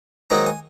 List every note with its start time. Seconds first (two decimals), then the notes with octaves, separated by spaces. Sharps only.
0.30 G#2 D#3 F#3 A#3 D#4 A#5
0.46 G#5